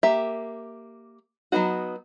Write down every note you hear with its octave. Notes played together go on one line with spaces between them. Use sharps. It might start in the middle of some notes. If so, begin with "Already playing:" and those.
A#3 G4 E5
F#3 A3 B3 D#4 F#4